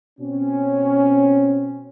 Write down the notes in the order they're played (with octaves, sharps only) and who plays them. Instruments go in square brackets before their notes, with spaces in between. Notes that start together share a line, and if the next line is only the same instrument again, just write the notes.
[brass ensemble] B2 C4 C#4